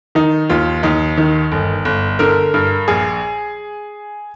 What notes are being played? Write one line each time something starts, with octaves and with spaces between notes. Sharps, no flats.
D#3 D#4
D#2 F4
D#2 D#4
D#3
G1
G1
D3 A#4
G2 A#4
A#1 G#4